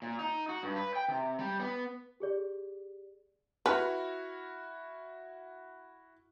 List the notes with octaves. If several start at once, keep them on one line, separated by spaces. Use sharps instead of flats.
A#2
D#4
F#4
G2
B4
G5
C3
G3
B3
G4 G#4 D5
E4 F#4 B4 F6